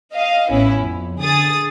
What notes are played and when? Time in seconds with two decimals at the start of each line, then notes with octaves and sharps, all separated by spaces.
0.14 D#5 F5
0.50 A1 B3 C#4 E4
0.80 F2
1.20 D3 G#4 D#6 A6